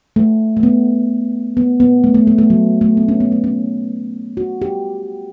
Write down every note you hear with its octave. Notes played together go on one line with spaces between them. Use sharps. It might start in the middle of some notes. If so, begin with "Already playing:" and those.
A3
A3
B3
B3
B3
A3
A3
A3
A3
F#3
A3
B3
C#4
B3
A3
C#4
F#4
G4